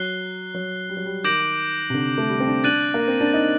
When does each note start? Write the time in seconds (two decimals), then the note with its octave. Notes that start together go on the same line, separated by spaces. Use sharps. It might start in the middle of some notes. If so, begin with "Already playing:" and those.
Already playing: F#3 F#6 C7 G7
0.54 F#3
0.90 G3
0.97 F#3
1.06 G3
1.24 D#3 D6 G6 A#6 D7 F#7
1.90 C3
1.94 D3
2.18 A3
2.30 G3
2.40 C4
2.47 D4
2.64 D4 F#6 A6 D#7 F#7
2.94 A#3
3.08 C4
3.20 D4
3.34 D#4